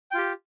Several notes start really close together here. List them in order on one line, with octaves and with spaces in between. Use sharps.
G5 F4 G4